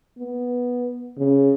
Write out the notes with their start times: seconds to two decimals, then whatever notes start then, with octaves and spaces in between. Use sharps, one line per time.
0.18 B3
1.18 C#3